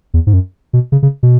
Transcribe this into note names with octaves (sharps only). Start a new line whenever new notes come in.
E2
G#2
F#2
B2
C#3
C#3
B2